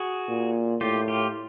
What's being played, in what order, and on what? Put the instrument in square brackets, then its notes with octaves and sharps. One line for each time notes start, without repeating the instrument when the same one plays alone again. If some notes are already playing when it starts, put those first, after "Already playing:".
Already playing: [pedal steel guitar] F#4 G#4
[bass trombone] A#2
[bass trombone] A2 [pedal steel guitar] F4 G4
[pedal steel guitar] F4 G4